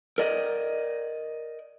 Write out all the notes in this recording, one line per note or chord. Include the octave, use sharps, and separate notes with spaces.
A#4 D5 D#5